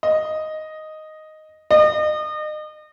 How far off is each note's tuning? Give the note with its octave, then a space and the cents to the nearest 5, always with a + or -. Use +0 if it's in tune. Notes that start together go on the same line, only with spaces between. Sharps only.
D#5 +0
D#5 -35